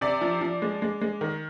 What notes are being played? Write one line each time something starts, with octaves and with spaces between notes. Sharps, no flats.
C3 D5
F3
F3
G#3
G#3
G#3
D#3